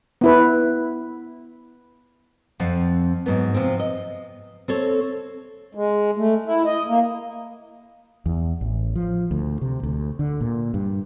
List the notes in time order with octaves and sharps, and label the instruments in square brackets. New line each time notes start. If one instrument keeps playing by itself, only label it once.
[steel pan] B3 E4 B4
[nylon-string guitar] F2 F3 C4 F#5
G#2 F#3 B3
C3 F3 B3 C4
D#5
C4 A4 C#5
[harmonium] G#3
A3
E4
D#5
A#3
[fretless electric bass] E2
A1
F3
D2
C3
D2
D3
A#2
G2